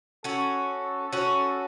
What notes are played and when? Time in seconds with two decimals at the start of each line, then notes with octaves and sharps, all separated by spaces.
0.24 C#4 F#4 A4
1.13 C#4 F#4